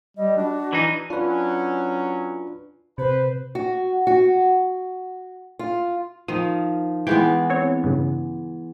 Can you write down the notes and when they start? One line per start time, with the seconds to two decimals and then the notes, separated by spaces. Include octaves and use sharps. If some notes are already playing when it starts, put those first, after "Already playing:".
0.17 G3 D#5
0.37 D4 F#4
0.73 E3 D#4
1.10 F#3 C#4 D4 F4 B4
2.98 C3 B4 C5
3.55 F#4
4.07 F#4
5.59 F4
6.28 D#3 F3 D#6
7.07 E3 G#3 B3 G5
7.50 C4 C#5
7.84 G2 C#3